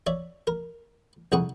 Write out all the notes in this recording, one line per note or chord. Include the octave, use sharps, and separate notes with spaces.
C#5 D5 E5
A#4
C2 F2 G#4 F#5 C#6